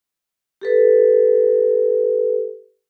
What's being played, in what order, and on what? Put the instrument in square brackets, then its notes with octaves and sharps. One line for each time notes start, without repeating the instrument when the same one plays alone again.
[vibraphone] G4 A4 B4